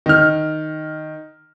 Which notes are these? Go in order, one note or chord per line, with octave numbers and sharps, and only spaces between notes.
D#3 F6